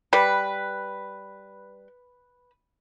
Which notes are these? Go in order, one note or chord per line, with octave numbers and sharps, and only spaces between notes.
G3 B4